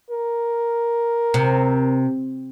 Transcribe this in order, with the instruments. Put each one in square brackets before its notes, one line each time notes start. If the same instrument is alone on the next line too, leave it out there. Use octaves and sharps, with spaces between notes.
[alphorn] A#4
[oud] C3